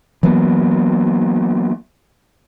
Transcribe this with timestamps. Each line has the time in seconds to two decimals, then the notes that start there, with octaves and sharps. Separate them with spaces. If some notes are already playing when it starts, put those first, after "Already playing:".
0.23 E3 F#3 A#3 B3